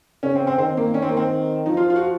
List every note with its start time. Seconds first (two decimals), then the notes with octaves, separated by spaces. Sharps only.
0.23 C#3 C#4
0.36 C4
0.47 C4
0.58 D#3 C4
0.77 A#3
0.94 C#4
1.02 C4
1.09 A#3
1.17 C4
1.66 F3 D#4
1.77 F4
1.90 F4
1.96 F#4